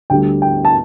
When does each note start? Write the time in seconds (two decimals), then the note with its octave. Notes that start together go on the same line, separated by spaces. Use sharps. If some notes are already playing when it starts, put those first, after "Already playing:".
0.10 D2 D3 G3 G5
0.42 G5
0.65 A5